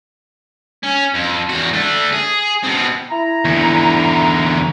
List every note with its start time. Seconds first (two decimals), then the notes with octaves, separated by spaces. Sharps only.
0.84 C#4
1.14 F2
1.49 E2 F#4
1.73 A3 D4
2.12 G#4
2.63 B2 C4
3.10 E4 A#5
3.45 E2 D3